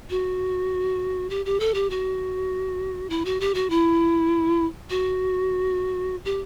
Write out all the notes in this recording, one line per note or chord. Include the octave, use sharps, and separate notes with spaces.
F#4
G4
G4
A4
G4
F#4
E4
F#4
G4
F#4
E4
F#4
G4